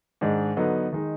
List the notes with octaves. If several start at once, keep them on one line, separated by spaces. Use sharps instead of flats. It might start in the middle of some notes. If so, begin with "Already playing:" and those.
G#2 D#3 G#3 D4
D3 F#3 B3 D#4
D#3 G#3 D#4